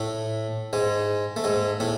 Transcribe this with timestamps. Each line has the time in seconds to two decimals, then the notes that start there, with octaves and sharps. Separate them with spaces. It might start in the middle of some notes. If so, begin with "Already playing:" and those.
Already playing: A2 A3
0.73 G#2 G#3
1.36 A3
1.44 G#2 G#3
1.80 A2 A3